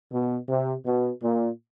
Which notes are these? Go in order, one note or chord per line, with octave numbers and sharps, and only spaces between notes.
B2
C3
B2
A#2